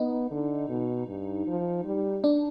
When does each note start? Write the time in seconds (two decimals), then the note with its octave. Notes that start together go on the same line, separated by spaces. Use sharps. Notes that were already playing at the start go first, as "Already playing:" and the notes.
Already playing: B3 D#4
0.31 D3
0.69 B2
1.07 G2
1.47 F3
1.84 G3
2.24 D4